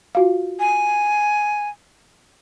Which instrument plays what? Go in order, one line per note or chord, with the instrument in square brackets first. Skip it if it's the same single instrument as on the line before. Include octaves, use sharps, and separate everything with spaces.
[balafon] F4 F#4 F5
[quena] G#5